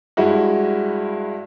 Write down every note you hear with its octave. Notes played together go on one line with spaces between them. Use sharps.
G2 G#3 E4 F#4